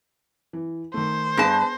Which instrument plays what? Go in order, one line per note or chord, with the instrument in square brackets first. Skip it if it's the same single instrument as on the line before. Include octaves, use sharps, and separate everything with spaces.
[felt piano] E3
[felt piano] D#3 A3 [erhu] C5
[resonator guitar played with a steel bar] G2 A5 [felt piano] B3 G#4 A#6